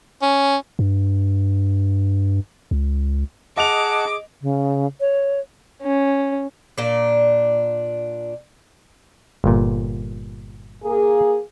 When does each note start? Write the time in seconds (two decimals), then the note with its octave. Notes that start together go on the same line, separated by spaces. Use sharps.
0.22 C#4
0.79 G2
2.71 C#2
3.57 G#4 D#5 F#5 A5 D6 F7
4.42 C#3
5.01 C#5
5.82 C#4
6.78 A#2 D4
9.44 G1 A#2
10.84 A#3 G#4